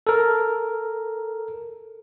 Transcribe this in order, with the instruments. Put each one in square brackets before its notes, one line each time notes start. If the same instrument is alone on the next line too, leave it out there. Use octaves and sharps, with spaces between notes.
[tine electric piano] A4 A#4